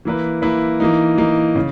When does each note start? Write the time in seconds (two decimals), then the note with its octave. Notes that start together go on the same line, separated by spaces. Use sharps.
0.05 E3 A#3 E4 B4
0.42 E3 A#3 E4 B4
0.80 E3 A#3 D#4
1.18 E3 A#3 D#4
1.55 C#3